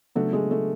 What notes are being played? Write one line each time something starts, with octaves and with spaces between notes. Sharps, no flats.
C#3 F#3 A3 B3 D4 F#4
G#3
A3